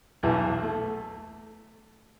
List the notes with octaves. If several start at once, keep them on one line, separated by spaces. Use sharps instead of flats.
B1 E2 B2 E3
A3